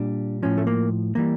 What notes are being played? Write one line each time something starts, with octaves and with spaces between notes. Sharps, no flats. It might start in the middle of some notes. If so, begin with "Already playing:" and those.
Already playing: A#2 G3 D4
A2 F3 C#4
A3
A#3
E3 G3 A#3